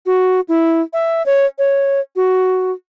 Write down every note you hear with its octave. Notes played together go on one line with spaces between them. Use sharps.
F#4
E4
E5
C#5
C#5
F#4